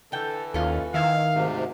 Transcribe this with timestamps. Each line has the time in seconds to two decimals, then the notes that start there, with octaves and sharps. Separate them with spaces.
0.12 D3 E3 A4 G5
0.54 D#2 C#4 F4 A4
0.94 D#3 E4 E5 F5
1.34 D2 G#2 C3